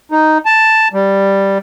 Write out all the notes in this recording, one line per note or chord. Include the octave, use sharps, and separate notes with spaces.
D#4
A5
G3